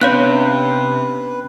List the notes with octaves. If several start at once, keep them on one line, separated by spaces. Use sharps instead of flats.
C3 B3 C#4 D4 B4 C#5 F5 F#6